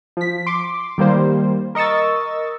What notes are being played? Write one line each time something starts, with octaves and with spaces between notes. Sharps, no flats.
F3 B6
C6 D6
D#3 G3 A#3 C5
A#4 D#5 C#6 E6 A6